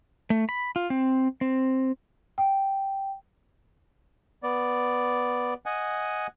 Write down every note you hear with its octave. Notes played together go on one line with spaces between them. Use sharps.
A3
B5
F4
C4
C4
G5
B3 D5
D#5 F#5 G#5